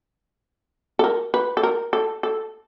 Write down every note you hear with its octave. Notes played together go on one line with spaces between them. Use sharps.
A4
A#4
B4
A4
A#4
A4
A4